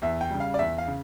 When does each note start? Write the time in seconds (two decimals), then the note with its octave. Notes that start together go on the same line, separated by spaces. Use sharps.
0.02 E2 E5
0.21 G5
0.31 C#3 G3
0.40 F5
0.54 D5
0.59 E2 E5
0.78 F5
0.87 C#3